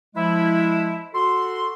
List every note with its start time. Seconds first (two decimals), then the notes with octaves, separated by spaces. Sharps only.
0.15 F3 G#3 E4
1.14 F#4 A4 C6